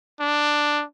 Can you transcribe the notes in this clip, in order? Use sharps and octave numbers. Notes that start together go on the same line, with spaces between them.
D4